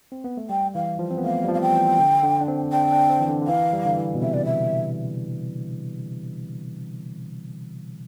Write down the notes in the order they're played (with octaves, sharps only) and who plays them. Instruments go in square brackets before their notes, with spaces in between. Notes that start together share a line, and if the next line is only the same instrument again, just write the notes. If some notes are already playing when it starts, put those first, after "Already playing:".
[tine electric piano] C4
B3
A3
[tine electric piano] G3 [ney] G5
[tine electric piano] E3 [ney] F5
[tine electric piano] F3
C4
B3
[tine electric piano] A3 [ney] F5
[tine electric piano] G3
F3
[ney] F5
G5
[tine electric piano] E3
D3
D3
D4
C4
[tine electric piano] D4 [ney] G5
[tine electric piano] D4
C4
E3
D3
D3
[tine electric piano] E3 [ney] F5
[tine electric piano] G3
D3
E3
B2
[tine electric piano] C3 [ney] E5
[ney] D5
E5